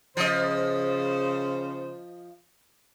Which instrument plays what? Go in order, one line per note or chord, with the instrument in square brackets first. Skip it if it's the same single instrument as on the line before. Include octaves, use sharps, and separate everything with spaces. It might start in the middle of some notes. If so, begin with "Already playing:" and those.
[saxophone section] C#3 C5 [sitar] F3 D#5